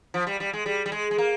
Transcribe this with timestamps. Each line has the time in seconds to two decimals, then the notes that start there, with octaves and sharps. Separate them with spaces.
0.14 F3
0.27 G3
0.40 G3
0.53 G#3
0.66 G3
0.86 G3
0.92 G#3
1.11 G#3
1.18 A#3